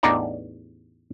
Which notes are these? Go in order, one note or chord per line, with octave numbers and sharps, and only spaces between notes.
A1 E2 D4 D#4 D5 A#5